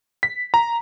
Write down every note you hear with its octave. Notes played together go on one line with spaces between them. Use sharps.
B6
A#5